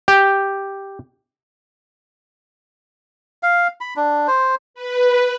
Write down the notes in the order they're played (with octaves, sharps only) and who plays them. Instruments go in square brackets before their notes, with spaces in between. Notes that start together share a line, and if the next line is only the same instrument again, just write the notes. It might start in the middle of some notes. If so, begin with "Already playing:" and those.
[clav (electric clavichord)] G4
[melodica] F5
B5
D4
C5
[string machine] B4